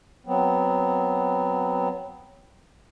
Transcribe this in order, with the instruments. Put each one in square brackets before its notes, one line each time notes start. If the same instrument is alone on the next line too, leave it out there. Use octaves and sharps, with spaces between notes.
[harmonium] F#3 B3 C4